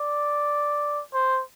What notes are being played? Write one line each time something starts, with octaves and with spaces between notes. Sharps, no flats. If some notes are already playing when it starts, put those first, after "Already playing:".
Already playing: D5
C5